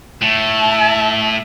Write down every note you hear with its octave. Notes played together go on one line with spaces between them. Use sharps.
A2 E5 A5